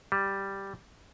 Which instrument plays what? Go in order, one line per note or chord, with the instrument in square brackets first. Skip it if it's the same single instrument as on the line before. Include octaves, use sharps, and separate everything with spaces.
[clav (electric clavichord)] G3